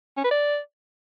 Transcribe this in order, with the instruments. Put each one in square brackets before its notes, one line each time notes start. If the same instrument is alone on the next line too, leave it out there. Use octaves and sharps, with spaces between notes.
[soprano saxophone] C#4
B4
D5